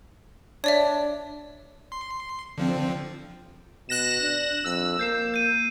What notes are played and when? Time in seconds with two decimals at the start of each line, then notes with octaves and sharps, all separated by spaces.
0.64 D4 C#5 D5 E5
1.92 C6
2.58 D3 F3 C4
3.89 B2 F#6 A#6 E7
4.21 D4
4.64 F2 E6
4.99 A#3 G6 C7 E7
5.34 G6 D#7